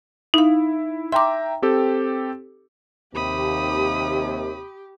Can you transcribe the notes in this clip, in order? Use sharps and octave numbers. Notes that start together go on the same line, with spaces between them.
D#4 E4 F5
E5 G5 A#5 C6 D6
C4 G4 A4
D#2 C3 G4 B5 D#6